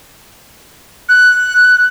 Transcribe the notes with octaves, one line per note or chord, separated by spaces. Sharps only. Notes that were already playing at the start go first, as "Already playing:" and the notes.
F#6